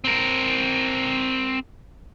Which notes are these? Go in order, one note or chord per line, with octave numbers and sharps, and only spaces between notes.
C4 A#4